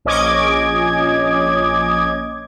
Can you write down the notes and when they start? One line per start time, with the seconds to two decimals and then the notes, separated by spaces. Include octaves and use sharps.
0.05 A#1 C#4 D#5 D6 G#6